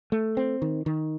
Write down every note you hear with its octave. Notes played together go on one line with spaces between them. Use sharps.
A3
C4
D#3
D#3